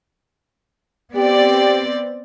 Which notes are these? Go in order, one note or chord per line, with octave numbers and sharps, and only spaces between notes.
B3 C4 G4 D5